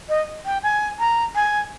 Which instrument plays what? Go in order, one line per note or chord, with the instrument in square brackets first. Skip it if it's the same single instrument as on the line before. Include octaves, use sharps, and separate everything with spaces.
[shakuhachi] D#5
G5
G#5
A#5
G#5